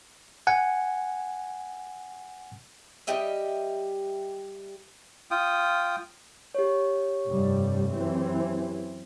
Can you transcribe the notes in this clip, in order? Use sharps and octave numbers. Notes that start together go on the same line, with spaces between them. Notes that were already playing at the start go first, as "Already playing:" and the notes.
F#5 G#5
G3 G4 D#5 E5
F4 G5 D#6
G4 C#5
F1 G2 G3
F#2 E3 C4